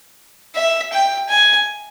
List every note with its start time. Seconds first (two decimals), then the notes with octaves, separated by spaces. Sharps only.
0.55 E5
0.92 G5
1.29 G#5